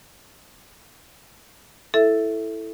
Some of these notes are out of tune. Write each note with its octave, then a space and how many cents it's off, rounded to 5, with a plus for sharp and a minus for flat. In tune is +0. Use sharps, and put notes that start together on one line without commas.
E4 +0 A4 +0 E5 +0